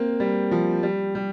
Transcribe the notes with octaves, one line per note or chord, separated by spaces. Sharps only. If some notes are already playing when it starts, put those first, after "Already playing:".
Already playing: A#3 C4
G3
F3
G3
G3